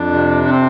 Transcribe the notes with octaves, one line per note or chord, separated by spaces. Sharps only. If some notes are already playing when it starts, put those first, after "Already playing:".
Already playing: F2 D4
C3
D4
C4